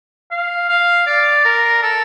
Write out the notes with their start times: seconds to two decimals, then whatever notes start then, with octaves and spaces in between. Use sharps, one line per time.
0.31 F5
0.69 F5
1.07 D5
1.45 A#4
1.83 A4